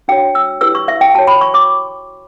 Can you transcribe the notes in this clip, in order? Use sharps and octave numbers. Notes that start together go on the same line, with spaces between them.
D4 F#4 C#5 G5
E6
E4 G4 B4 E6
C#6
E5
G5
F#4 C#5 A5
B5
C#6
D6